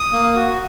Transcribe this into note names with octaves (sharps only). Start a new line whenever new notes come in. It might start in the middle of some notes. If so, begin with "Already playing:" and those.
Already playing: D#6
A#3
F#4